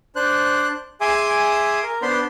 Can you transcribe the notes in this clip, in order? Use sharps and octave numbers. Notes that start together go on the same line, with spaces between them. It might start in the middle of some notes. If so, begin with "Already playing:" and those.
D4 C5 F#6
G#4 E5 G#5 C6 D6 D#6
A#4
B3 D4 C5 B5 C6